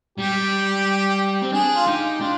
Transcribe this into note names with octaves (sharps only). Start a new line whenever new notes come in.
G3 G4
C4
D4 G#4
F4
D#4 G4
D4 F4